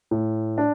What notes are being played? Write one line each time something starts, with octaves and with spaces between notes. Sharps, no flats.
A2
D4